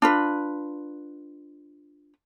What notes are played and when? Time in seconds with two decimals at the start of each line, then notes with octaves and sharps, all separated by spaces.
0.02 D4 F4 B4